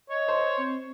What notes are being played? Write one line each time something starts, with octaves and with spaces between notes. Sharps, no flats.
C#5 D#5
C5
C4